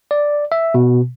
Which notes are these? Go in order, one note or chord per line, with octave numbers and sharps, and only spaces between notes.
D5
E5
B2